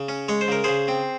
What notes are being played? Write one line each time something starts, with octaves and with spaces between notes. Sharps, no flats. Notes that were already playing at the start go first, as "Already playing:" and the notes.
Already playing: C#3
C#4
G#3 C#5
C5
C#3 A#4
C#3 G#4 C5
C4